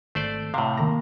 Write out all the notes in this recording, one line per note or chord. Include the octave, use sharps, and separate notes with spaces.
G#1 A3 C5 D5
A2 C3 F5
D#3 A#3 A#5